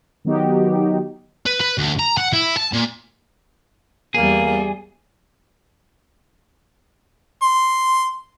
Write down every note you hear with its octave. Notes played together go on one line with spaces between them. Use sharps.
D#3 F#3 B3 D#4 F#4 G4
B4
B4
D2
A#5
F#5
E4
A5
A#2
E2 G3 A#3 G#4
C6